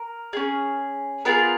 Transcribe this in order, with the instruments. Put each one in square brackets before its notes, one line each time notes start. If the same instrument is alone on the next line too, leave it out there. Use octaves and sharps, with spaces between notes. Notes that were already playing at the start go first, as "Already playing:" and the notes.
Already playing: [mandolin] A#4
C#4 G#4
B3 F4 G#4 A#4